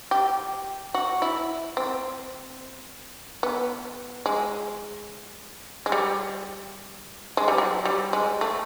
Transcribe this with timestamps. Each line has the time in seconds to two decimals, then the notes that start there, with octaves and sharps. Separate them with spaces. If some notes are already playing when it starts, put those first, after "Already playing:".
0.11 G4
0.94 F#4
1.22 E4
1.77 C4
3.43 B3
4.26 G#3
5.86 G#3
5.92 G3
7.37 G#3
7.48 G3
7.58 F#3
7.85 G3
8.13 G#3
8.41 A3